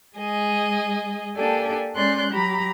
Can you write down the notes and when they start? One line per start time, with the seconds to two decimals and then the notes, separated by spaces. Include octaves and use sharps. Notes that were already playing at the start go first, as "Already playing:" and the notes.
0.18 G#3 G#4 D#5
1.36 A#3 D4 G4 A4 G5 G#5
1.95 G#3 C#4 D5 C6 F#6 G6
2.32 F#3 G4 A#5 B5